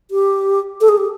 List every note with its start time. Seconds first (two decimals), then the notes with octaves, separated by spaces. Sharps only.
0.11 G4
0.81 A4
0.89 G#4
0.97 G4